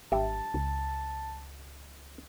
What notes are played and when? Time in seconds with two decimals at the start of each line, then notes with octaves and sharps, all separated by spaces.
0.12 G#1 G2 G4 E5 A5
0.54 C#2